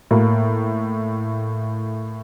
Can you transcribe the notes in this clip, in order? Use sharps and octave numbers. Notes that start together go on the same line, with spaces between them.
A2 A#3